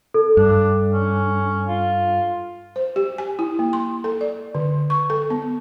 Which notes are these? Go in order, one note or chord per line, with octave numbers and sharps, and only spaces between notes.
A4
G2 D4
C#4
F4
C5
G4
G#5
E4
A#3
C6
A4
D5
D3
C#6
A4
B3